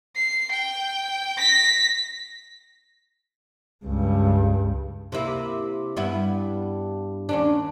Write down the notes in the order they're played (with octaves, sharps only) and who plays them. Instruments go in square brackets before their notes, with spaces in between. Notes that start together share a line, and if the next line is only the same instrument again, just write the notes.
[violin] C7
G5
A#6 B6
[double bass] C#2 G2
[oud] C3 A#3 E4
G2 B3 E4
D#2 C#4 D4